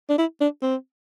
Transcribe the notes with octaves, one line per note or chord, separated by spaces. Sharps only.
D4
E4
D4
C4